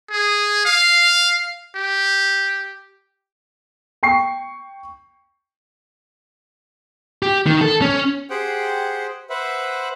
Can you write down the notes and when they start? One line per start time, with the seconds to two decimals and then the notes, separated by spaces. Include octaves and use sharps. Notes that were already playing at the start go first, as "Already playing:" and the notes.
0.11 G#4
0.65 F5
1.75 G4
4.03 G5 C#6 C7
7.23 G4
7.47 D#3
7.61 A4
7.82 C#4
8.30 G4 G#4 C5 F#5 G5
9.30 B4 C5 E5 F#5